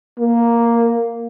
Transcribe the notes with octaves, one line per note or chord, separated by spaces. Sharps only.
A#3